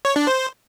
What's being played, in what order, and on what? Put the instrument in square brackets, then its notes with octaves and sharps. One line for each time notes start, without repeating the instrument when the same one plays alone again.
[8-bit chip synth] C#5
D4
C5